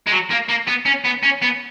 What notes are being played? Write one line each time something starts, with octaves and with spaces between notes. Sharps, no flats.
G#3
F#3
A#3
A#3
B3
C#4
B3
C#4
B3